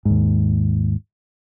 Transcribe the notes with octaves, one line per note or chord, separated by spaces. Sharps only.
D#2 G#2